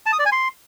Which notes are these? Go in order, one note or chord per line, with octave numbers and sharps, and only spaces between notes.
A5
D#6
D5
G#5
C6